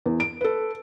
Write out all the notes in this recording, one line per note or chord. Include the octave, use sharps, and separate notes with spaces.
E2
D7
A4 B4